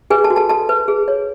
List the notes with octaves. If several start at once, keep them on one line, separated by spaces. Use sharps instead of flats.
G#4 B4 G#5
A4 A5
F#4
A4 A5
F#4 A4 A5
B4
G#4
C#5